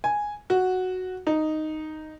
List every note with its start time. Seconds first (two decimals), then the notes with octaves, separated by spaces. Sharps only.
0.04 G#5
0.50 F#4
1.27 D#4